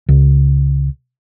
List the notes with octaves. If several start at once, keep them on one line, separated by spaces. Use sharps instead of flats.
C#2